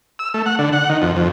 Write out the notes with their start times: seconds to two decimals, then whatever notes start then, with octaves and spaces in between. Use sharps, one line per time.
0.19 E6
0.34 A3
0.46 F#5
0.59 D3
0.73 F#5
0.89 D#3
1.02 F2
1.16 F2